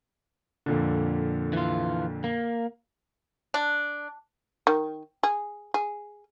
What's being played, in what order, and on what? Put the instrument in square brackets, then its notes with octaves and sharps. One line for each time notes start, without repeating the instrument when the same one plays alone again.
[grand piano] F2 A#2 D3
[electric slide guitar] E3 F4
A#3
[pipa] D4
[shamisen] D#3
G#4
G#4